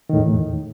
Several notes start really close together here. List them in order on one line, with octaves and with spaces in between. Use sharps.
D#3 A2 E2